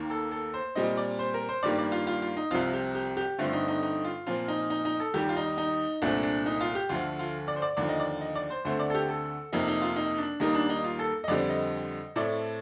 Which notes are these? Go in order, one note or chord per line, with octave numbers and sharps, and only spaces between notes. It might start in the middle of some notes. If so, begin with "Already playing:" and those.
Already playing: D#2 D#3 A#3
A4
A4
C5
A#2 G3 C4 D#5
D5
C5
A#4
C5
G2 D#3 G3 A#3 D5
D5
F4
F4
F4
D#4
C2 C3 F3 C4 F4
G4
G4
G4
G2 D3 A3 C4 F4
D#4
D#4
D#4
F4
A#2 F3 C4 F4
D#4
D#4
D#4
A4
D#2 D#3 G3 G4
F4
D#4
D#4
C2 A#2 A3 C4 D4
D4
D#4
F4
G4
D2 D3 F3 A3 F4
F4
D5
C5
D5
D#2 D3 F3 D5
D#5
D5
D#5
D5
C5
D2 D3 A3 C4 C5
D5
A4
G4
A4
F2 C3 F3 A#3 D#4
D#4
F4
D#4
D4
D#2 D#3 G3 A#3 D#4
D4
D#4
F4
A4
D#5
F2 D3 G3 C4 D5
D#5
A2 A3 C4 D5